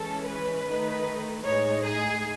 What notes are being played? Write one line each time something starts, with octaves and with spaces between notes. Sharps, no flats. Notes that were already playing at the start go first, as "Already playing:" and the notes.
Already playing: E3 G#3 C#4 A4
B4
D#3 A3 D#4
A2 G#3 D#4 C#5
G#4